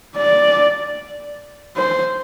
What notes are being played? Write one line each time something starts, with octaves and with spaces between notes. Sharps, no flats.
D5
C5